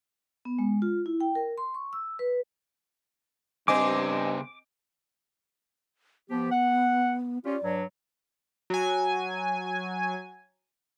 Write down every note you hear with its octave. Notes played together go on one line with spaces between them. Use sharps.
B3
G#3
F4
E4
G5
A#4
C6
C#6
E6
B4
G2 C#3 C4 C5 D#5 G#5 D6
F3 B3 G4
F#5
C#4 F4 G4 D5
G2 F#3
F#3 G#5